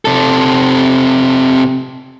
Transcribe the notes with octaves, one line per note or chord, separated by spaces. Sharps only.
C3 A4